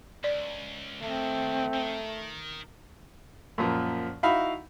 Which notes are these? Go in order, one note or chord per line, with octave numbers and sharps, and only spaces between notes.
C#2 D5
D#2 D#3 A3 C4
D#3
F#2 A#2 F3
D#4 E4 F#4 F5 B5